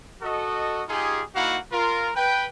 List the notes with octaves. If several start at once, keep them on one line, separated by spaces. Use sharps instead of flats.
F#4 A4 D#5
D#4 F4 G4 G#4
A#3 D#4 E4 F#4 F5 F#5
F4 A#4
B4 G5